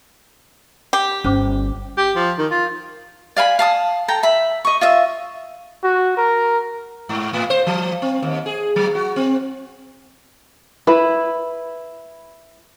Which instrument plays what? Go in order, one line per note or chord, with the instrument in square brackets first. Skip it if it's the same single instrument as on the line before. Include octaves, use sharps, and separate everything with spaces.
[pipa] G4
[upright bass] G1 [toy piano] C#4 C5 D6
[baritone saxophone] G4
F3
D#3
F4
[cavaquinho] D5 F5 G#5 B5
F5 A5 D#6
A4 G5 A#5
E5 B5
D#5 C#6
F4 D#5 E5
[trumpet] F#4
A#4
[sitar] G#2
A2
C5
F3
C4
D#2
G#4
F#3
F#4
C4
[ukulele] E4 B4